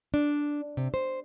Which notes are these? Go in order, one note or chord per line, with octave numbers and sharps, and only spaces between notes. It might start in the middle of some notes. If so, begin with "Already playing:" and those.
D4
C3
C5